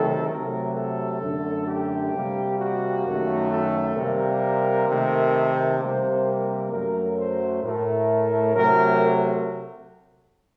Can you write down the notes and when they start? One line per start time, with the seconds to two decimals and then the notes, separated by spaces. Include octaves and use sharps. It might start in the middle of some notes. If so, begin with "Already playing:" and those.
Already playing: C3 D#3 F#3 A3 A4
0.29 C3 F#3 A3 A#4
0.75 A4
1.21 F#2 D3 F#3 A3
1.66 G4
2.13 C3 G3 A#3
2.58 F#4
3.05 F#2 D#3 A3
3.50 A4
3.96 C3 G3 A#3 A#4
4.87 C3 D#3 A3
5.80 C3 G3 A#3 C5
6.25 A#4
6.71 F#2 F#3 A3 A#4
7.17 C5
7.62 A2 A3 A#4
8.54 C3 F#3 A3 A#4